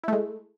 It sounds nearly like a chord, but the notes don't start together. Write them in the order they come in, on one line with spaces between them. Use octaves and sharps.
E4 A3 G#3